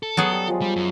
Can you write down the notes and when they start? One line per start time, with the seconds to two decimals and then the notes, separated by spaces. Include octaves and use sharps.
0.03 A4
0.17 F#3 B3 G#4
0.32 G3
0.48 F3 G#3
0.61 G3 D6
0.76 F#2